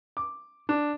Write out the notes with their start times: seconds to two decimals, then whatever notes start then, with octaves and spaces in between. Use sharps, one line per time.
0.17 D6
0.69 D4